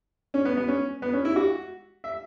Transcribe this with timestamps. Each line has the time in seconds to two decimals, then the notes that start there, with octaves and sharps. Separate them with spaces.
0.34 C#4
0.45 B3
0.57 B3
0.68 C#4
1.02 B3
1.13 C#4
1.25 E4
1.36 F#4
2.04 E5